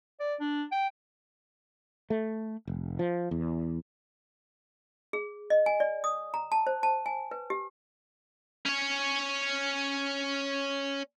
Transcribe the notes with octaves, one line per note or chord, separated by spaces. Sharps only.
D5
D4
G5
A3
F1
F3
E2
G#4
D#5
G#5
D5
D#6
A#5
A5
C5
A5
G#5
B4
G4
C#4 C#5